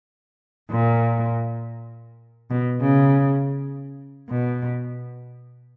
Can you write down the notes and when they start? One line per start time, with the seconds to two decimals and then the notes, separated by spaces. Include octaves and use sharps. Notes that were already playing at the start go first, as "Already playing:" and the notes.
0.71 A#2
2.50 B2
2.81 C#3
4.30 B2